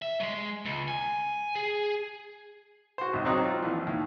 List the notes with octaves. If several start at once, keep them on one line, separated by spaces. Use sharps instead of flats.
E5
F#3 G#3
C#2
G#5
G#4
F#4 C5
G#1 C#2
D#3 F#3 C4 D4 D#4
F4
A#1 E3
D#2